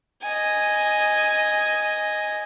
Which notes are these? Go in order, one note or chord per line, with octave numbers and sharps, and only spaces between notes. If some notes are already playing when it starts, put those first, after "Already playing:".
D#5 G#5